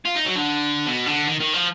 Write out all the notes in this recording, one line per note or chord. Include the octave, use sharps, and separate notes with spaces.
F4
D#4
F#3
D3
B2
D3
D#3
D#3
F3